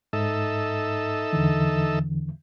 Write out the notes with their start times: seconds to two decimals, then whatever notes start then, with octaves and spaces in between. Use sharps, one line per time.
0.13 G#2 D#4 A4 E5
1.33 E2 D3 E3